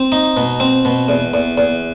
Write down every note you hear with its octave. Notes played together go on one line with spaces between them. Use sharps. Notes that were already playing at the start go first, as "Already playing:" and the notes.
Already playing: C4
D#4
B2
C4
B2
E2
E2
E2